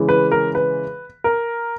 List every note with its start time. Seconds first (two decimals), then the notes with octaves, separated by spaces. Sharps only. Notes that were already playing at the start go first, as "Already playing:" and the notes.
Already playing: C#3 E3 G#3
0.09 B4
0.32 A#4
0.55 B4
1.24 A#4